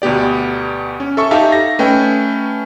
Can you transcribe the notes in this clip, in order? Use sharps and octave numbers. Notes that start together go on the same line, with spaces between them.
D2 B2 B3 G4 D5
C#4
A4 E5 C#6
D#4 G4 A4 E5 F5 A5
A#6
A3 C#4 B4 D#5 G5